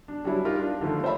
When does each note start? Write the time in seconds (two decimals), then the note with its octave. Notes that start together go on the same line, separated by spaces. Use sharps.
0.08 D4
0.24 F#3 G3 C#4 D4 E4
0.45 D#4 F4 G4 A#4
0.59 D4
0.81 D3 D#3 F3 A3
1.04 C5 C#5 E5 B5